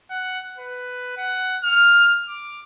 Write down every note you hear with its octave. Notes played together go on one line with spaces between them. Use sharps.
F#5
B4
F#5
F6
D6